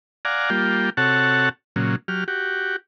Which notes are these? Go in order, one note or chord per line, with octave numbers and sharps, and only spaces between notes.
D5 F5 F#5 G#5 A#5
G3 A#3 F4 G5
C3 F#4 A4 C#5 F#5 A5
A#2 C#3 F#3
F#3 G4 F6
F#4 G4